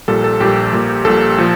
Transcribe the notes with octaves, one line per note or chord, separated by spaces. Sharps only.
A#1 A#2 G3 A4
A4
A#1 A#2 G3 G4
A#1 A#2 G3
A#1 A#2 G3 A4
A#2 F3